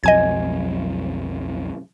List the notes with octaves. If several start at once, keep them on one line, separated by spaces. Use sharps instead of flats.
B1 F2 F#3 D#5 G#5 G#6